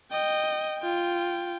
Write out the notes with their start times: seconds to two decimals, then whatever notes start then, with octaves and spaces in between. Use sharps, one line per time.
0.12 D#5 G5
0.79 F4 G5